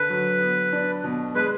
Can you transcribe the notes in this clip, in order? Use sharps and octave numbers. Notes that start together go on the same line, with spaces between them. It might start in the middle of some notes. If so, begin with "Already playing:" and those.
Already playing: D3 B4
F#3
B3
D4
B2
G#3 B4